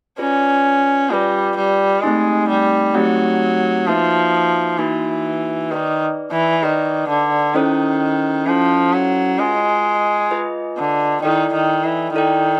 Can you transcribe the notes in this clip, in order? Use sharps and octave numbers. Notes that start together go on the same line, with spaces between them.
C#4 F4 G#4 B4 D5
G3 F4 G#4 B4 D5
G3
G#3 A3 C4 D#4 G4
G3
F#3 A3 C4 D#4 G4
F3 A#3 D#4 F#4 B4 E5
E3 A#3 D#4 F#4 B4 E5
D#3 G#4 B4 D5
E3
D#3 G#4 B4 D5
D3
D#3 C#4 E4 A4 C5
F3 C#4 E4 A4 C5
F#3
G#3 F4 G#4 B4 D#5
F4 G#4 B4 D#5
D3
D#3 E4 A4 D5 G5
D#3
E3
D#3 E4 A4 D5 G5